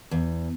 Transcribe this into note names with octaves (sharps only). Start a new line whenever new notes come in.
E2